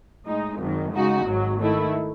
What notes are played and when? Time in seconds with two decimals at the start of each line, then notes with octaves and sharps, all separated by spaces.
0.26 A2 G#3 D#4
0.58 G#1 F#2 D#3
0.92 C#3 G#3 D#4 F#4
1.26 G#1 G#2 F#3
1.59 D#3 A3 E4